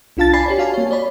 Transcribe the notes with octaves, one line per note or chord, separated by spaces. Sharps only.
C2 D4 F4 F5 A5 A6
D5 G#5 B5 A6 C7
G4 C#5 D5
F#4 F5 G#5 A5
A#3 C#5
C#5 D5 B5